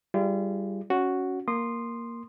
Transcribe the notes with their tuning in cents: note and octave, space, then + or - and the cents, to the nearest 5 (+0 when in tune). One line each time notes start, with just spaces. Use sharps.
G3 +0 F4 -40 G#4 +0
C#4 +5 F#4 +0
A#3 +0 C6 +0 D#6 -30